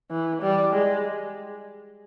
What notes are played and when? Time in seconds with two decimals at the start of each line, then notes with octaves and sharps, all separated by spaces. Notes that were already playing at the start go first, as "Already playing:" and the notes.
0.11 E3
0.42 G3
0.73 G#3